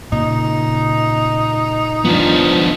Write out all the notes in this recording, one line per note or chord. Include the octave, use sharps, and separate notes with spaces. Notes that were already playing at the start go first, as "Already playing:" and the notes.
A#2 C#3 D#4
F3 B3 D4